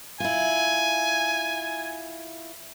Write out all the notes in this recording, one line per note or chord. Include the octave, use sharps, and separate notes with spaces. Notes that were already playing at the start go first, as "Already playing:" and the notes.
E4 F4 G#5